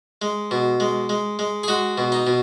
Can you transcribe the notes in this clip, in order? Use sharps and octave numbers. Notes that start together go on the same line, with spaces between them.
G#3
B2
G#3
G#3
G#3
G#4
G#3 F#4
B2
D#4
B2